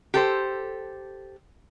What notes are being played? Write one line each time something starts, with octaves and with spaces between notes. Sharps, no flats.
G4 A4 C5